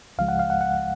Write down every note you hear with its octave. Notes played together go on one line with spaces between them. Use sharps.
C#2 C#3 F3 G#3 F5
F#5
F5
F#5
F#5